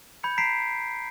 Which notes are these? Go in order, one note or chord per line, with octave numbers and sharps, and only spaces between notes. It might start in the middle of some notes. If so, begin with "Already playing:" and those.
B5 G6 G#6 C#7
A#5 B6 C7 D7